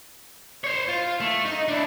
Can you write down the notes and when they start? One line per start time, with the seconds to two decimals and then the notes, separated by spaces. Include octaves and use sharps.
0.64 C5 C#5
0.89 F4
1.20 A3
1.45 D#4
1.68 D4 E4